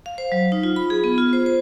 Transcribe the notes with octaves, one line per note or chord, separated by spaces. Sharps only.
F5
C5
F#3
D#4
F4
B5
G#4
B3
F4
C5
C5